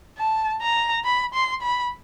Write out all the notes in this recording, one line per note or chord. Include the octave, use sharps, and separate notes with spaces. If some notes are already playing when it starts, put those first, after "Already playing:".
A5
A#5
B5
C6
B5